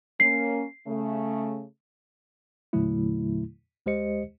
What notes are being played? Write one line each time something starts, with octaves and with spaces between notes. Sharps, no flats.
A#3 C#4 C7
C#3 A3
E2 A#2 D3 F#3 A3 E4
D2 G#3 G4 C5 D#5 C#7